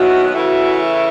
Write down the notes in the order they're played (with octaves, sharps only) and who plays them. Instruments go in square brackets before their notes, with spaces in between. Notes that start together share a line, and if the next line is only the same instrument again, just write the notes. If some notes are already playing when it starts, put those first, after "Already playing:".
Already playing: [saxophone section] D#2 D#3 F#3 B3 E4 [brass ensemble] F#4
[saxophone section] C#3 E3 A3 E4 [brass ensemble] F#4